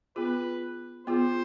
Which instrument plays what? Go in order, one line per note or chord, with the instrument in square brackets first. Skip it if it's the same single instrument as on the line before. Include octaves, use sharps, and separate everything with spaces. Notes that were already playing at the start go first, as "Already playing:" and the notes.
[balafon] B3 F4 G#4 [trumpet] B4
[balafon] B3 F4 G#4 [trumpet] C5